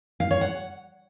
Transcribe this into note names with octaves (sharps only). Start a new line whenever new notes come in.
F5
C#5
F#5